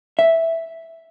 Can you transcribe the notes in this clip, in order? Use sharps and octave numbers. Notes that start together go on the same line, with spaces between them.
E5